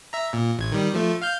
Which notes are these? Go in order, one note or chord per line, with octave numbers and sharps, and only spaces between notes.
E5 A#5
A#2
A1 G#6
D#3 G3
F3 A3
F5 F6 G6